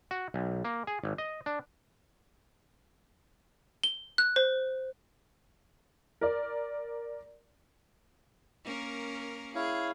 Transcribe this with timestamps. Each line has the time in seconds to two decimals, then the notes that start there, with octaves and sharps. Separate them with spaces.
0.11 F#4
0.34 B1
0.65 A#3
0.87 G#4
1.04 G#1
1.18 D#5
1.46 D4
3.84 G7
4.18 F#6
4.36 C5
6.21 A#4 D5
8.64 A#3 C#4 A#4
9.55 E4 G#4 C#5 F5